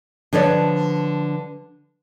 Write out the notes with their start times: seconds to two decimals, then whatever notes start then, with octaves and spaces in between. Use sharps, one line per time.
0.33 D3 F3 B4 C#5 D5